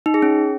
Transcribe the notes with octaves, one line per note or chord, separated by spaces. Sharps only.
D#4
G#4
C#4